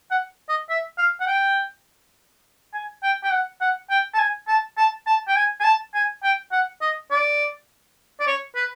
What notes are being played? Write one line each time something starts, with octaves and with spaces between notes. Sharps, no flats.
F#5
D#5
E5
F5
F#5
G5
G#5
G5
G5
F#5
F#5
G5
A5
G#5
A5
A5
A5
G5
G#5
G#5
A5
G#5
G5
F#5
D#5
D5
D5
C#5
B4